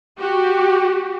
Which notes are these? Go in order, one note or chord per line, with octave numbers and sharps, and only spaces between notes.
F#4 G4